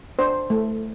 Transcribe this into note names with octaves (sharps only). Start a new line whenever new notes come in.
D4 C5
A3